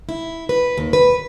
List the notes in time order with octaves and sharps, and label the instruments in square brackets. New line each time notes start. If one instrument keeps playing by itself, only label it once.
[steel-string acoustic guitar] E4
B4
D#2
B4